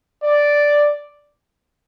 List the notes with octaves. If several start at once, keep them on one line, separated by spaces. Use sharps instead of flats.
D5